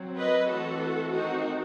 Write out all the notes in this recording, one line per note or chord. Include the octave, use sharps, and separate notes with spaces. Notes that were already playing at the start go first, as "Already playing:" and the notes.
Already playing: F#3 C4
B4 D#5
E3 A3 C4 F#4 A4
D#3 A3 C4 D#4 F#4